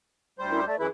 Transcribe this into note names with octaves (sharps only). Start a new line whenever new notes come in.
D2 G3 C5
C#4 E4 A#4
A3 D5 E5 A5
F#2 E3 E4 G#4 B4